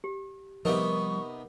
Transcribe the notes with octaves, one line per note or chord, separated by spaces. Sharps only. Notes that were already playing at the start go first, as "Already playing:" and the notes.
G4
C3 F3 G3 B3 D#4 A#4 C#6